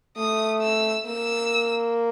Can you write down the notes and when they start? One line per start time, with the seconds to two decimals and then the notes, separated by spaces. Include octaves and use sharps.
0.17 A3 D#6
0.62 E6
1.06 A#3 E6